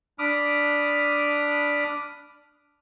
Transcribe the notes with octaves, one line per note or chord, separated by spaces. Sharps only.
D4 B5 D6 D#6 F6